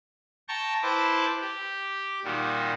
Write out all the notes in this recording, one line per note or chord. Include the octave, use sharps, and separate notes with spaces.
G5 A5 A#5 C#6
E4 B4 C5 A5 D6
G4
A#2 D#3 G3 F#4